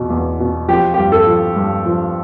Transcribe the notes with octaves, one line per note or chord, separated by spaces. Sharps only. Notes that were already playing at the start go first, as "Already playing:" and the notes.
Already playing: E2 B2
E2
B2
F3 G4
G2 G4
A4
F3
G2
F3